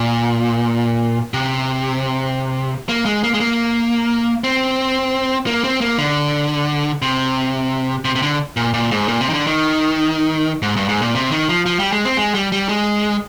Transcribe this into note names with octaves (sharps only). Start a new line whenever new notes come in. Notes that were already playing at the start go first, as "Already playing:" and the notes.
Already playing: A#2
C3
A#3
G#3
A#3
G#3
A#3
C4
A#3
C4
A#3
D3
C3
C3
C3
D3
A#2
A#2
G#2
A#2
C3
D#3
D3
D#3
G#2
G2
G#2
A#2
C3
D#3
F3
F3
G3
G#3
C4
G#3
G3
G3
G#3